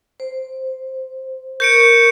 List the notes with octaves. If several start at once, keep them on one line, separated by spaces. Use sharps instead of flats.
C5
A#4 C#6 G6 C#7 D7